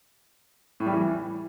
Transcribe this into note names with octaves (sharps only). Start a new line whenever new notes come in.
A2
G3
E3